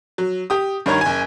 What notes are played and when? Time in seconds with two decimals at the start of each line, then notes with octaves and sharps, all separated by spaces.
0.18 F#3
0.50 G4 D#6
0.86 G2 D#3 C#5 A#5 G#6
1.01 F#1 G#5